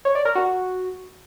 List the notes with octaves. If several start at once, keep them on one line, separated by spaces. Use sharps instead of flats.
C#5
D5
A#4
F#4